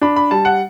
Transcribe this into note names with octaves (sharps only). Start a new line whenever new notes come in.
D4 B5
B5
G3 A5
F#5